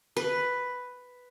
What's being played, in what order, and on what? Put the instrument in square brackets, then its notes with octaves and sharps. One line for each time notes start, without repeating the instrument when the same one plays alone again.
[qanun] B4